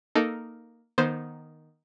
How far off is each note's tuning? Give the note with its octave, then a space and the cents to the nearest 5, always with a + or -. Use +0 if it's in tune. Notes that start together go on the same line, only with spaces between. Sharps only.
A#3 +0 D#4 +0 A4 +0
D#3 +0 B3 -30 C5 +0